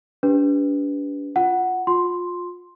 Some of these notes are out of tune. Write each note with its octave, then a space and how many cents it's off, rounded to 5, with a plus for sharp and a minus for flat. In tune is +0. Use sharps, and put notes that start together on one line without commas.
D4 -40 G4 +15 B4 +0
F4 +0 F#5 +0
F4 +25 C6 +0